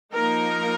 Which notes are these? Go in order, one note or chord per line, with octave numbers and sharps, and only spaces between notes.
F3 A#3 D#4 A#4